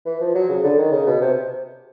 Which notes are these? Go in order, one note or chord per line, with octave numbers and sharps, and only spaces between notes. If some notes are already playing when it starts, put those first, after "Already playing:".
E3
F3
F#3
C#3
D3
D#3
C#3
B2
C3